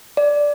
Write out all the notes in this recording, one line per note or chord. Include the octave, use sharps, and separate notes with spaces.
D5